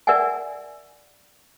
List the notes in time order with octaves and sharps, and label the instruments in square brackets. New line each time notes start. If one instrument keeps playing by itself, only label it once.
[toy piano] A#4 D5 E5 F#5 G#5